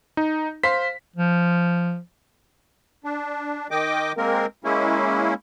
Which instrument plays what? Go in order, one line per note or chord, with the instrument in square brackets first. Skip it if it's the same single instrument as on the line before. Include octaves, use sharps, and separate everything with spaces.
[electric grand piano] D#4
[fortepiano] C5 F5 C6 [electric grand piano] B6
[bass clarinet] F3
[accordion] D4
D#3 D#5 G5 D6
G#3 A#3 C4 A#4
G#3 A#3 C#4 E4